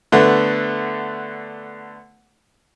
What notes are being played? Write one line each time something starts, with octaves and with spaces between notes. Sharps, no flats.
D3 A3 B3